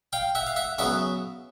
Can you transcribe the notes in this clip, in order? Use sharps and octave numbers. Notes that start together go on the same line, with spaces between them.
F5 G5
E5 F#5
F5
E5 F#5
C#3 F#3 B3 E5 F#5